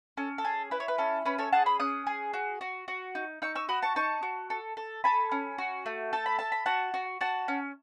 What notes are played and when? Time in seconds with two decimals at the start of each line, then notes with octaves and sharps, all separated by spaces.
0.17 C#4 A4
0.38 A4
0.45 G#4
0.71 E4 B4
0.80 C#5
0.88 B4
0.98 C#4 A4
1.25 C#4 B4
1.38 A4 C#5
1.53 G#4 F#5 A5
1.66 B5 D#6
1.80 C#4 D#6 F#6
2.07 G#4
2.33 F#4
2.61 F#4
2.88 F#4
3.15 D#4
3.42 D#4 C#6 E6
3.55 C#6 E6
3.69 F#4 B5 D#6
3.82 A5 C#6
3.96 D#4 A5 C#6
4.23 F#4
4.50 A4
4.77 A4
5.04 A4 G#5 B5
5.32 C#4
5.58 F#4
5.86 A3
6.13 A4 A5
6.26 B5
6.39 A4 A5
6.52 B5
6.66 F#4 F#5 A5
6.94 F#4
7.21 F#4 F#5 A5
7.48 C#4